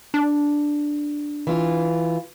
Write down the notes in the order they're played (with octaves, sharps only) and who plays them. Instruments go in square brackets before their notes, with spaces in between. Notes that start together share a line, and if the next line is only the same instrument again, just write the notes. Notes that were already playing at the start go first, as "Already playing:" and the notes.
[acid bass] D4
[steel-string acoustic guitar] E3 F4